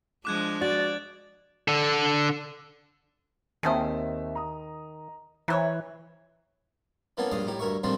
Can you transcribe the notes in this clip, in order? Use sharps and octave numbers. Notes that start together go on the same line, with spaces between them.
F3 G#3 D4 D6 F#6 G#6
F#4 D5 A6
D3 A4
D#2 D#3 C4 G#4 A4 C5 E5
A#5 D#6
E3 E4 C5 C#5 A#5 F#6
E3 A#3 B3 C#4 A4
A#1 G2 D4 D#5 F5
A2 D#4 G4
D2 G2 A#4 E5 C#6
D#3 F3 G3 A3 C4 D4